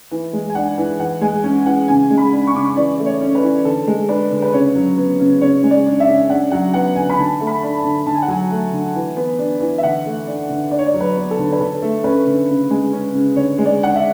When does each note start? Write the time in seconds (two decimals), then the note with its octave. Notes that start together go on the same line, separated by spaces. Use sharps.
0.11 E3
0.33 G#3
0.50 G#5
0.55 D4 F#5
0.78 E3
1.00 E3 F#5
1.21 G#3 G#5
1.44 C#4 G#5
1.66 E3 F#5
1.88 C#3 G#5
2.10 G#3
2.18 B5
2.32 D4
2.47 C#6
2.54 C#3 D6
2.65 C#6
2.76 E3 D5
2.99 A3
3.06 C#5
3.21 C#4
3.35 B4
3.43 E3
3.65 D3 A4
3.87 G#3
4.09 D4 B4
4.32 D3
4.42 B4
4.53 C#3 C#5
4.75 F#3
4.98 B3
5.20 C#3
5.41 C#3 C#5
5.63 G#3
5.71 D5
5.86 D4
6.00 E5
6.08 C#3
6.30 D4 F#5
6.51 F#3 F#5
6.74 B3 F#5
6.96 D3 G#5
7.10 B5
7.18 D3 A5
7.40 A3
7.47 B5
7.63 D4
7.77 A5
7.84 D3
8.06 D3 A5
8.15 G#5
8.22 F#5
8.28 F#3 G#5
8.51 A3
8.72 D3
8.95 E3
9.17 B3
9.39 D4
9.61 E3
9.78 E5
9.83 D3 F#5
10.05 A3
10.27 D4
10.49 D3
10.71 D4 D5
10.79 C#5
10.86 D5
10.94 F#3
11.00 B4
11.16 B3
11.31 A4
11.38 D3
11.52 B4
11.60 D3 A4
11.82 A3
12.04 C#4 B4
12.26 D3
12.48 C#3
12.70 G#3
12.93 C#4
13.14 C#3
13.36 D3 C#5
13.58 G#3
13.66 D5
13.81 D4 F#5
13.96 E5